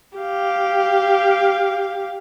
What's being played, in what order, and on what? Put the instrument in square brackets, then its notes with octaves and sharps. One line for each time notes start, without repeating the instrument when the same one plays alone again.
[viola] G4 F5